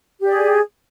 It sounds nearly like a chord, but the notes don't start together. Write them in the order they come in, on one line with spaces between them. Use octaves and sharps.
G4 D5 G#4